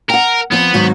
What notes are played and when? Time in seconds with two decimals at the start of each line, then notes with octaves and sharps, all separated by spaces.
0.10 A#4 F#5 G5
0.52 F3 B3 C4
0.74 G#2 D#3 F#3